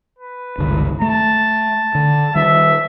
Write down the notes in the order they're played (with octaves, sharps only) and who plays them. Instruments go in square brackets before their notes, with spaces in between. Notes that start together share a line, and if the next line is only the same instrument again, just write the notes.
[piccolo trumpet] B4
[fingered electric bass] G1 C#2 D#3
[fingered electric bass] A3 [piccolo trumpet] A5
[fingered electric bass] D3
[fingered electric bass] D#3 G3 [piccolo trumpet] E5